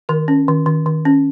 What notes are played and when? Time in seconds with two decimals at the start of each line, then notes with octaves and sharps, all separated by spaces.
0.09 D#3 A#4
0.28 C#4
0.48 D#3
0.66 D#3
0.86 D#3
1.05 C#4